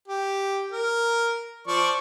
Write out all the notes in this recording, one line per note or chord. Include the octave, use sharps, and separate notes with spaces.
G4
A#4
F3 D5 C#6